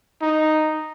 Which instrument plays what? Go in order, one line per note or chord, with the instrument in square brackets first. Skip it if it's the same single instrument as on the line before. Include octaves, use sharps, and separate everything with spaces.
[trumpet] D#4